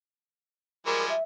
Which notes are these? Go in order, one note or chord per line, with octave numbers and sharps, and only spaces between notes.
F3 G3 G#3 A#4
E5